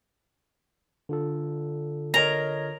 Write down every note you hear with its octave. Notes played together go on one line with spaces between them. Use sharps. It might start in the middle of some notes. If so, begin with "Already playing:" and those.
D3 F4 A4
A#4 C#5 D#5 A#5